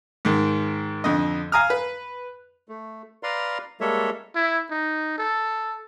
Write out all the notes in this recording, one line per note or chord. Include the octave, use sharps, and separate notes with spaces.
G#2 D#3
F2 D3 D#5
F5 G#5 A#5 D#6 F6
B4
A3
B4 D5 F5 A#5 C6
G3 G#3 A#3 A4 C#5 E5
E4
D#4
A4